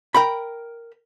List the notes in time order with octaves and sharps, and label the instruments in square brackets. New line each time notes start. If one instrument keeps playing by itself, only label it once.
[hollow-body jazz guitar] A#4 G5 B5